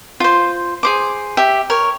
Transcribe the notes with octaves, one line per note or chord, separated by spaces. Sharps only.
F4 C5
G#4 C5 D6
G4 E5
A#4 C#5